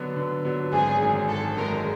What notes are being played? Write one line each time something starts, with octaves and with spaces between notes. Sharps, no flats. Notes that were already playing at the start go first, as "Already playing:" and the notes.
Already playing: D3 F#3 B3 D4
D3
F#3 B3 D4
G#1 G#4
F#2 D#3 G#3
G#1 A4
F#2 D#3 G#3 A#4